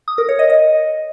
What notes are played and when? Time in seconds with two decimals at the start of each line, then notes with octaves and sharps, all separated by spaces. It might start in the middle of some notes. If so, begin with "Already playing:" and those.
0.08 D#6
0.18 A#4
0.29 C#5
0.39 D#5
0.50 D#5